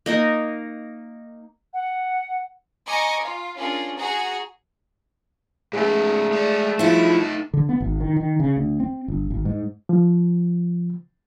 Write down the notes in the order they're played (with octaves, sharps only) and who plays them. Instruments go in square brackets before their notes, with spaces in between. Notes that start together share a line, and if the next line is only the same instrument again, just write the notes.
[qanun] A#3 D#4 A#4
[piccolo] F#5
[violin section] D#5 G#5 A#5 C#6 D6
F4
C#4 D4 F4 G#4 A#4
F#4 G#4 F#5 A#5
[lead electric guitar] G#2 C#4 [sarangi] A3 [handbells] G#4
[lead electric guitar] G#3 D5
[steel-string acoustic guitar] F3 E4 [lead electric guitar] D#4 A4
[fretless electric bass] D3
B3
G#1
D#3
D#3
C#3
D2
C4
G1
G#1
G#2
[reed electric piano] F3